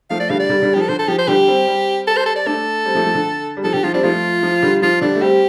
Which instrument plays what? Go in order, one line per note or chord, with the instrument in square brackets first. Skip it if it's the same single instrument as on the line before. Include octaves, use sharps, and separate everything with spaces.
[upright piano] F3 A3 [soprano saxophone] F5
[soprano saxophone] D5
[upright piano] D3 G3 [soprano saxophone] F5
[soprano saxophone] D5
[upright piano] D3 G3
D3 G3
[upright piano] F3 [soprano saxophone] G4
[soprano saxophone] A4
[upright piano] D3 [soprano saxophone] C5
[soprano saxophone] A4
[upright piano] F3 [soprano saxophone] G4
[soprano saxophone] C5
[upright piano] D3 G3 [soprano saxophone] G4
[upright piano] G3 C4
G3 C4
[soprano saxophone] A4
C5
A4
D5
[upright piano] A3 D4 [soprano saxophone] A4
[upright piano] G3 C4
F3 A3
F3
D3
G3
[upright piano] F3 [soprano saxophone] A4
[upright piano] D3 [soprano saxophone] G4
[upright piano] F3 [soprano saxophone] F4
[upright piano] G3 C4 [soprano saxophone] D4
[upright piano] F3 A3 [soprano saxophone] F4
[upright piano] F3
D3 G3
[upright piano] F3 [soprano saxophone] F4
[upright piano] D3 G3 [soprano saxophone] D4
[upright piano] A3
[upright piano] G3 C4 [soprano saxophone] G4